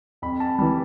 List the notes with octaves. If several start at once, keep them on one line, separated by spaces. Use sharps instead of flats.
F2 B5
A5
E3 G3 B5